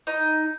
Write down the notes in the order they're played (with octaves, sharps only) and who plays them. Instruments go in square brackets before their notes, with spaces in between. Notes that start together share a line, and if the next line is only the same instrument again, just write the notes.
[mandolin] D#4